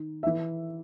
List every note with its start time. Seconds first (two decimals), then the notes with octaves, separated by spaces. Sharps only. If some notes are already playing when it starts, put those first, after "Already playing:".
Already playing: D#3
0.23 E5
0.27 E3